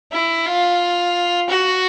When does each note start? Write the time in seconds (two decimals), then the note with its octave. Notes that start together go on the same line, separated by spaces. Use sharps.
0.12 E4
0.46 F4
1.50 F#4